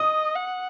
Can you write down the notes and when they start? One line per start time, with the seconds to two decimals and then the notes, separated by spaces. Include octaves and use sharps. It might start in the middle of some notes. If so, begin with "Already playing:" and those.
Already playing: D#5 D#6
0.35 F#5